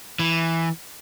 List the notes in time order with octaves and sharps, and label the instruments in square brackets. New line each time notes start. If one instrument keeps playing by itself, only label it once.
[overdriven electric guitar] E3